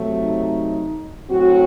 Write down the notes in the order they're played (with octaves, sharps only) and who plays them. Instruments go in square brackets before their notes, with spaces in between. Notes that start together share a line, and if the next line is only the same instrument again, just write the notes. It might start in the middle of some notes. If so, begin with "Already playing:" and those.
Already playing: [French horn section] C3 F#3 A3
D#4
A2 F#3 C4 F#4